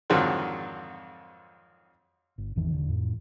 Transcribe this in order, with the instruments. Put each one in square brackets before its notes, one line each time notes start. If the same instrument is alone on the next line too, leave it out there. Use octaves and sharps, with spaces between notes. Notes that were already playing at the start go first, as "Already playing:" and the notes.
[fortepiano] F2 G#2 D3 D#3 F#3 C4
[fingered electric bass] G1
G#1 E2 D#3 E3
E1 D3
F2 A2